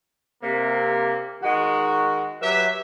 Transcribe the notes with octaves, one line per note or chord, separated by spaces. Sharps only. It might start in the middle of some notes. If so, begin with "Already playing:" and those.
C3 A#3
D#3 G#3 F#4
F#3 G4 B4 E5